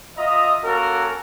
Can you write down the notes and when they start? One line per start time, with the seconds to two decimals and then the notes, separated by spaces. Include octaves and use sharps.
0.17 F4 D#5 E5 A#5 D#6
0.63 A#3 C#4 F#4 A4 A#4